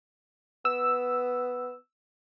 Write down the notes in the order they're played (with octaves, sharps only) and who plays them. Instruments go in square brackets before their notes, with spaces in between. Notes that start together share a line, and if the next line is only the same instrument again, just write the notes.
[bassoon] B3 [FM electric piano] E6